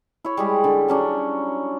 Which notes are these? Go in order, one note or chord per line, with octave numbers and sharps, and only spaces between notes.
E4 C#5
G3 G#3 G4
D3
F#3 C#4 D4